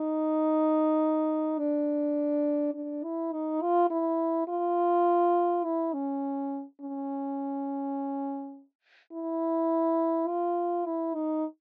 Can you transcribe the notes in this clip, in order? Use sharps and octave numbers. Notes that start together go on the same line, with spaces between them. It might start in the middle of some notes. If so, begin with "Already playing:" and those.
Already playing: D#4
D4
D4
E4
D#4
F4
E4
F4
E4
C#4
C#4
E4
F4
E4
D#4